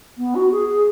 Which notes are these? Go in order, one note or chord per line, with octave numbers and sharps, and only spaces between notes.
B3
F#4
G#4
G#4